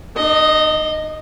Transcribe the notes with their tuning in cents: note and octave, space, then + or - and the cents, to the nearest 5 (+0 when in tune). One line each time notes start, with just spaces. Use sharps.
D#4 -45 D#5 +0